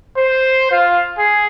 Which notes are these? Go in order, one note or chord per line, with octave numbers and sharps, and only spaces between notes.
C5
F4
G#4